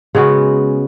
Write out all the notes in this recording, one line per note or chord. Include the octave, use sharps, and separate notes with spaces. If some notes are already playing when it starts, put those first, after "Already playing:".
C#3 G#3 B3 F#4